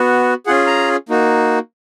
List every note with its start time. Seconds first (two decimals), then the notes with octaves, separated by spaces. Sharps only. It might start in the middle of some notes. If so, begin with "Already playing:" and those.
Already playing: B3 F#4
0.46 C#4 F4 G#4 F#5
0.67 A#5
1.09 A#3 D#4 F#4